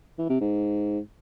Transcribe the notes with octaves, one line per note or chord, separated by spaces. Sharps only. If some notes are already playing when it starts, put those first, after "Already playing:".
E3
C3
G#2